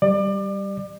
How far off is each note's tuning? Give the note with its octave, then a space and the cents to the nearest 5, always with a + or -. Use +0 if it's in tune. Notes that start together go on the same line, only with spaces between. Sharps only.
G3 +0 D5 +30